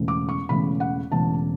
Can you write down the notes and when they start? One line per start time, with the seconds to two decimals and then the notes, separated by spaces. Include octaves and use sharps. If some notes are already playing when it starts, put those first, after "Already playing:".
Already playing: E1 E2 C#3 E3 A3
0.08 D6
0.29 C#6
0.49 E1 E2 C#3 E3 A3 B5
0.80 F#5
1.12 E1 E2 C#3 E3 A3 A5